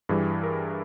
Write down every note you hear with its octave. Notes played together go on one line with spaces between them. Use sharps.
G2 E3 G3 G#4
A#4